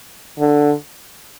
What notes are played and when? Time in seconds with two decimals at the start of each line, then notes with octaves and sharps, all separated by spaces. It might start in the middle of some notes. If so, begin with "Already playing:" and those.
0.39 D3